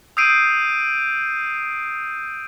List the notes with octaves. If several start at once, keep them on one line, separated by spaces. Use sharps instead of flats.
D#6 E6 G6 C7 D7 D#7